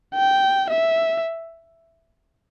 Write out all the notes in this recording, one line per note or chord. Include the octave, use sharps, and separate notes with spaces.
G5
E5